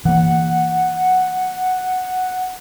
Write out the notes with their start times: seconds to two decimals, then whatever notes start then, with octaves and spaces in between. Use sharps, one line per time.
0.05 E3 A#3 F#5